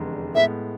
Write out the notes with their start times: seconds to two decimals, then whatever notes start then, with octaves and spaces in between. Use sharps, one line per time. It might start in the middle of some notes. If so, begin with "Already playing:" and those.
Already playing: F1 E2 D3 G#3
0.35 A2 G#3 B3 E5